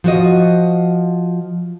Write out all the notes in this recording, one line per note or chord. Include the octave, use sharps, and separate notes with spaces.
F3 F#4 D#5